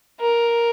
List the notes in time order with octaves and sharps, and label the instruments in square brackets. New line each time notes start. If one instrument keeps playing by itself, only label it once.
[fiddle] A#4